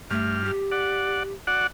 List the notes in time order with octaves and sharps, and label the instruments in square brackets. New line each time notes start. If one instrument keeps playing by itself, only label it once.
[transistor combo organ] G2 F6 [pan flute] A3
[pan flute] G4
[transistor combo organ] D5 F#5
F#4 D5 F#5